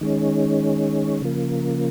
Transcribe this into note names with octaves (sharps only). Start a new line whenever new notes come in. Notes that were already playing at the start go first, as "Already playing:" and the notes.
D#3 G#3 C#4
C#3 F3 A#3